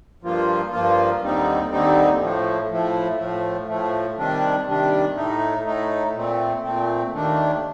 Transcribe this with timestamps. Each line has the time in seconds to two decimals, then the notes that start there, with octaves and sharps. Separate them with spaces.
0.22 G2 F3 A#3 F4
0.71 G2 F3 A#3 F4
1.21 D#2 D3 G3 C4 D#4
1.70 D#2 D3 G3 C4 D#4
2.20 A2 F3 A3
2.69 A2 F3 A3
3.17 A2 F3 A3
3.67 A2 F3 A3
4.16 C3 D#3 G3 D4
4.66 C3 D#3 G3 D4
5.16 A2 A3 D#4
5.64 A2 A3 D#4
6.13 A#2 A3 C4
6.63 A#2 A3 C4
7.13 D#2 D#3 A3 D4